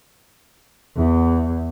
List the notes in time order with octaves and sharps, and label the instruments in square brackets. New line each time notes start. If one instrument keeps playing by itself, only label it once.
[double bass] E2